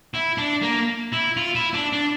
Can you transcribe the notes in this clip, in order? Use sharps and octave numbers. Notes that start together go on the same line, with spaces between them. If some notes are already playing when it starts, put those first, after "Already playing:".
E4
D4
A#3
E4
F4
E4
D4
D4